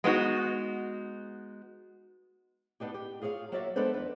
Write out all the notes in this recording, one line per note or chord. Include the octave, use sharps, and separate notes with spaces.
G#3 B3 D#4 F#4
B3 D4 D#4 G4
G4
F4 G#4 C#5 D#5 F5
F#3 A#3 F#4 C#5 D5 E5
G#3 B3 D4 A4 B4 C5
E2 B4